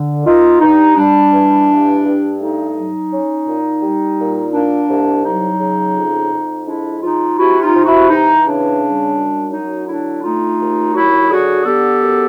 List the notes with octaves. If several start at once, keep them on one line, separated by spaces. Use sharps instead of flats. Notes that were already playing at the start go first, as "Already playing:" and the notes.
Already playing: D3
A#3 D#4 F4
G2 D#4
G3 D4
E3
G2
G2
A3 D#4
F#3
C#4
A#2
G3
A#2
A#3 D4
C2
F#3 D#4
C#3
F2
F2
G#3 D4 E4
F3 D#4 F4
C3 E4 F#4
D#4 F4
C3
E4 F#4
E3 D#4
C#3 D4
G3
F#2
F#3 D#4
D3 D4 E4
A3 D#4 F4
D#2
F#3 E4 F#4
D3 F#4 G#4
B3 G4 A4
F#2